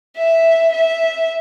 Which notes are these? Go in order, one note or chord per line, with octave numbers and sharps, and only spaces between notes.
E5
E5